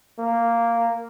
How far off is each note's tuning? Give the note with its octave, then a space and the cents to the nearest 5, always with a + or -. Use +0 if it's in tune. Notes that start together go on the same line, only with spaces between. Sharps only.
A#3 -5